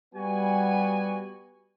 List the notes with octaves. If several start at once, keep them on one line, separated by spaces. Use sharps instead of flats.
G3 B3 F#4 G#5